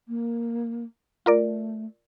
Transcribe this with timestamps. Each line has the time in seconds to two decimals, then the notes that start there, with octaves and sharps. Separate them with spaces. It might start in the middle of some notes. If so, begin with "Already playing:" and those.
0.08 A#3
1.26 A3 F4 A#4 D5